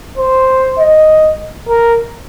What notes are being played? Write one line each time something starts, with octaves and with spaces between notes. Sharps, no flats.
C5
D#5
A#4